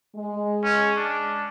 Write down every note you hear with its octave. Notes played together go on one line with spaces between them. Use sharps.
G#3
C#4
D4